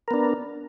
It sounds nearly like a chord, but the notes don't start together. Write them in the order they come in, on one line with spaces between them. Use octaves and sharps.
A#4 B3 D4